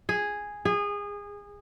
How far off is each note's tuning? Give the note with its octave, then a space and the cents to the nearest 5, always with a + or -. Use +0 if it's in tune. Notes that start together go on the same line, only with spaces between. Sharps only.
G#4 -5
G#4 -25